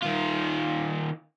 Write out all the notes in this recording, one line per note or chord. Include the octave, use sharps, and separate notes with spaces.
D#3 F4